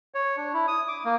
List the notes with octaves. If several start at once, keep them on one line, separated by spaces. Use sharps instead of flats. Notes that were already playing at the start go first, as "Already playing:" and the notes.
C#5
D4
E4
D#6
D6
A#3